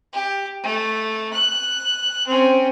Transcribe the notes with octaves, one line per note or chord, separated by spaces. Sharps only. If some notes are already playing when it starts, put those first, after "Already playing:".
G4
A3
F#6
C4 C#4